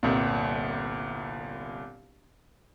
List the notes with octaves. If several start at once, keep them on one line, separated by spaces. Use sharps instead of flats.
G1 C2 A#2